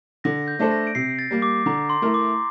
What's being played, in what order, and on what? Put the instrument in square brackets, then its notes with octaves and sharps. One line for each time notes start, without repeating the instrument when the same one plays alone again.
[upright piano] D3 [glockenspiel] A#6
[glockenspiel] G6
[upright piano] A3 D4 A4 C5
[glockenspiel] A#6
D7
[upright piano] C3 [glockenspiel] C7
[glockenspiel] A6
[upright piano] G3 A#3
[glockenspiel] D6
[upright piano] D3 [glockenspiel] A#5
[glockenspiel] C6
[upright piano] A3 E4 A#4
[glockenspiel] D6